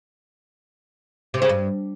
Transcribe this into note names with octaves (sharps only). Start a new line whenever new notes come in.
C3
C#3
G2